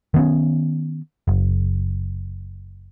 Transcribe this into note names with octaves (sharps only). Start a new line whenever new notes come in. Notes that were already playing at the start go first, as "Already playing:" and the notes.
D#3 B3 C#4
F#1